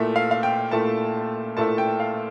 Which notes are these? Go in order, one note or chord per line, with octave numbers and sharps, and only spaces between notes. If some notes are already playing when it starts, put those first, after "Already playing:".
Already playing: A#2 A3 E4 E5
F5
F5
G5
A#2 A3 E4 A5
A#2 A3 E4 A5
G5
F5